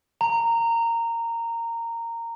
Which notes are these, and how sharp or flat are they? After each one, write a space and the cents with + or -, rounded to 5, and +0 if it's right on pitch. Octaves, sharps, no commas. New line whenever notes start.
A#5 -15